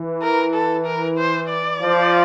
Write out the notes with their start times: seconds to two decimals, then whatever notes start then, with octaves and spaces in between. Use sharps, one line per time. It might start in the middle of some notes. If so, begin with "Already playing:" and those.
Already playing: E3
0.22 A#4
0.54 A4
0.86 A#4
1.18 C5
1.49 D5
1.82 F3